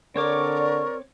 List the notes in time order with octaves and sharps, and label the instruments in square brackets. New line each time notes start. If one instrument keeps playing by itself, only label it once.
[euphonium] D3 [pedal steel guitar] C4 C#5 D6 [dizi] A#4 [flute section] D5 C#6